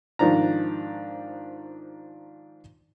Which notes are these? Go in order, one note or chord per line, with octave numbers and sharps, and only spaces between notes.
G#2 D#3 F3 D4 A#5